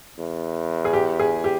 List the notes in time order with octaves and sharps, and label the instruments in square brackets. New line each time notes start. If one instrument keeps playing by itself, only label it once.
[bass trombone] E2
[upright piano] G#4
G4
G#4
G4